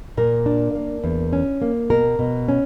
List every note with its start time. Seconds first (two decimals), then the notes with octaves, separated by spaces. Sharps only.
0.17 A#2 A#4
0.46 D4
0.75 A#3
1.04 E2
1.33 C#4
1.62 A#3
1.90 B2 A#4
2.19 B2
2.48 C#4